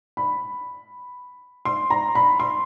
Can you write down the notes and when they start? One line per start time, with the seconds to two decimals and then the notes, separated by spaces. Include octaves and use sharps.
0.17 B5
1.65 C6
1.90 A#5
2.15 B5
2.40 C6